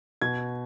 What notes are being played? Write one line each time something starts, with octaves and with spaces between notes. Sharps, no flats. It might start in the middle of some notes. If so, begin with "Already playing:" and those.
B2 G#6